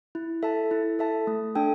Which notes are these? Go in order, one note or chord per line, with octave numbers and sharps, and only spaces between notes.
E4
A4 E5 A5
E4
A4 E5 A5
A3
D4 A4 G5